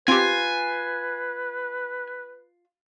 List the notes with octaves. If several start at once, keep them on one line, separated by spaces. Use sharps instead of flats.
C4 F4 G4 B4 G#5